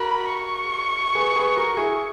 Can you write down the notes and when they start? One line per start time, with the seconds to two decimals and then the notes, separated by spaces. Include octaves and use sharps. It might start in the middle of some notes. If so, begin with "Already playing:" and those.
Already playing: F#4 A#4 B5
0.32 C#6
1.15 G#4 B4
1.36 G#4 B4
1.56 F#4 A#4
1.77 E4 G#4